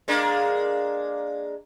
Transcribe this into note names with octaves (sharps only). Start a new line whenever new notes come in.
G#3 A#3 D4